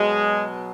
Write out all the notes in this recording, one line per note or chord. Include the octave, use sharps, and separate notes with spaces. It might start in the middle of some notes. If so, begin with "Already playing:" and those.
Already playing: B2 F#3 G#3